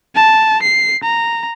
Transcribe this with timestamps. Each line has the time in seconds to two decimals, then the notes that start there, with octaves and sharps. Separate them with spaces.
0.15 A5
0.62 C7
1.04 A#5